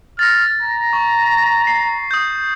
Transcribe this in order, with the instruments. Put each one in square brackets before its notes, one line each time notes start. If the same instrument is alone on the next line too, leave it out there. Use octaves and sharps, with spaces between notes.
[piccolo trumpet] F6 [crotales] A6 A#6
[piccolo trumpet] A#5
[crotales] C#6
C7
D#6 G6